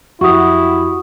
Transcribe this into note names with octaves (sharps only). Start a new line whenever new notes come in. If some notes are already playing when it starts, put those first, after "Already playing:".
F2 E4 F#4 G4 C#6 D#6